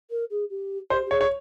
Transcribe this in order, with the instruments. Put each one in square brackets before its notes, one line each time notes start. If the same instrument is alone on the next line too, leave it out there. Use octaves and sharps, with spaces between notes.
[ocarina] A#4
G#4
G4
[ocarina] G4 [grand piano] C5
[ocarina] G4
[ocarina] G#4 [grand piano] C#5
[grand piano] C#5